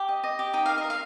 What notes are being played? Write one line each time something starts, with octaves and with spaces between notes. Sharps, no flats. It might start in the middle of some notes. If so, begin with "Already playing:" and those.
Already playing: G4
D#5
D#5
G4
D#4 G5
A#4 F5
D#5
A#4
F5